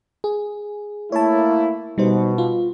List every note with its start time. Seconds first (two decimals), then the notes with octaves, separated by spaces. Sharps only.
0.24 G#4
1.12 A3 A#3 E4 C#5 A5
1.98 B2 G3 D#4 C5
2.38 F4